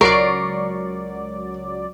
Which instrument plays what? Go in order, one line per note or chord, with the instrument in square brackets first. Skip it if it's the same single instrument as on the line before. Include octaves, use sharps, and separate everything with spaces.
[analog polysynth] C#2 F#3 D5 [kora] A#4 [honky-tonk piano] C#6 C7 D7